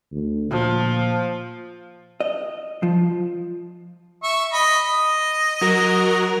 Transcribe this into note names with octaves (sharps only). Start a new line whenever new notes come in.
D2
A#2 F3
D#5
F3
E5 C#6
D#5 B5
D#5
F#3 F#4 A#4